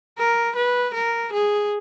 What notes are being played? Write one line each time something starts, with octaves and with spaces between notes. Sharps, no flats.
A#4
B4
A#4
G#4